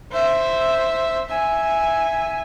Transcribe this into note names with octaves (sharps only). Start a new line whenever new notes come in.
C5 E5
E5 G#5